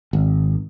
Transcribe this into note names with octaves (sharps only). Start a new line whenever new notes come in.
G#1